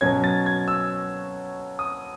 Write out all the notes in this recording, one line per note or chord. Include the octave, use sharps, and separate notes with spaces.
B2 F#3 C#4 G#6
A6
G#6
E6
D#6